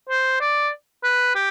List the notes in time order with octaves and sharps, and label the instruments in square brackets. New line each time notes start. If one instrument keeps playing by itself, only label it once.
[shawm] C5
D5
B4
G4